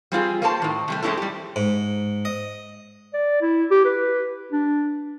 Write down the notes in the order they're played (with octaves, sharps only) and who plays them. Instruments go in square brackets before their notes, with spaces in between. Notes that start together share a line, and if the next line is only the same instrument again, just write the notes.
[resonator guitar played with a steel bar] G3 C4 F4 G#4
A#3 C4 A4 C5 A5
A2 D#3
C3 G3 A3
G#3 A3 C4 C#4 E4 A4
G3 G4
[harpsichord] G#2
D#5
[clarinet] D5
E4
G4
B4
D4